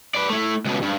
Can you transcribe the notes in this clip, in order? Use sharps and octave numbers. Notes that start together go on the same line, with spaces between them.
B4 D5
A3 E4
C#2 B2
G2